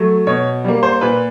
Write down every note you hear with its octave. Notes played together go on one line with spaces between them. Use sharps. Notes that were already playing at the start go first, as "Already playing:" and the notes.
Already playing: F#3 A3
B2 C#5
G3 A#3
C5
A#2 B4